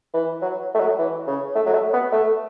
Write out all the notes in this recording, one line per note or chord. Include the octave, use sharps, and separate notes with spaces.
E3
F#3
A3
F#3
E3
C#3
A3
F#3
A3
B3
A3